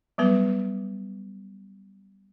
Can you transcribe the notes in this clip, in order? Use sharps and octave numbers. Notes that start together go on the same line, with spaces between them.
F#3 G3 B3 B4